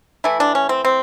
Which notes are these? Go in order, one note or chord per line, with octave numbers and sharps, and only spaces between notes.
E3 A3 E4
D4
C#4
C4
C4